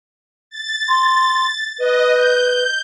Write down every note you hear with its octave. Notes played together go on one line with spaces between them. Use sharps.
A6
C6
B4 D#5
G6